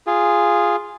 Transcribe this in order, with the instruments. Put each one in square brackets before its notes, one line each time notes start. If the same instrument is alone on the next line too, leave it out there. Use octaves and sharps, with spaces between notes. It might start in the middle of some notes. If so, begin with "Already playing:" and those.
[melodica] F4 G#4